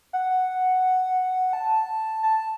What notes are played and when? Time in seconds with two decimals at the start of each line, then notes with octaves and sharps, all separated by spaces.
0.13 F#5
1.53 A5
2.23 A5